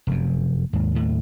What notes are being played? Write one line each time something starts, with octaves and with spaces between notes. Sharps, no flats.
F1 F#2
D#2 G#2
D#2 A2 A3